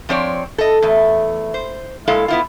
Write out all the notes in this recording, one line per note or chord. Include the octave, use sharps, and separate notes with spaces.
F3 C4 C#5 D5
A4 D#5
E2 A3
C5
A#2 G#3 E4 A4 F5
B3 E4 F4